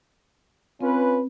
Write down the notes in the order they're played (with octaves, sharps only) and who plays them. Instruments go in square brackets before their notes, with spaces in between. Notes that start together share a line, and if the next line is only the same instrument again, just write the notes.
[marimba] C4 [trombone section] C#4 F4 B4